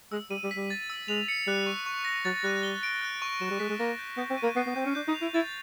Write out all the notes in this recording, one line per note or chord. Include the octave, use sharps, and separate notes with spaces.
G#3 E6
G3 D#7
G3
B6
G3
A6
E6
G#3 F7
C#7
G3 F#6
C#6
C#6
A#6
F#3 A6
G3 F#6
G7
D7
F#6
C#6
F#3 E7
G3
G#3 B6
G#3
A#3 A#6
G6
B3 G6
C4
D#7
A#3
B3 C7
B3
C4 G6
C#4
D4 G6
D#4
F7
E4
E4 A6